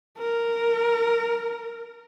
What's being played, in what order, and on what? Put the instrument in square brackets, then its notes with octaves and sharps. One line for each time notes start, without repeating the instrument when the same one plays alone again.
[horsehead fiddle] A#4